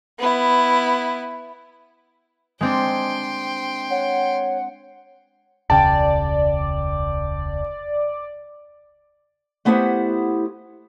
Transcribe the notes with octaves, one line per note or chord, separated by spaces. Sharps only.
B3 E4
G#3 C4 D4 G5 C6
C#5 F#5
E1 C#2 C#3 D5 G5 A5
A3 B3 E4 G4 C5 F#5